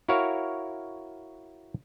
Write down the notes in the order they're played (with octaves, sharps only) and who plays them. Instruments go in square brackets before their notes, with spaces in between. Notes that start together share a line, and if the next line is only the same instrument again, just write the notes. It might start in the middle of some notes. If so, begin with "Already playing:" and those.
[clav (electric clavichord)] E4 F#4 A#4 C#5 F5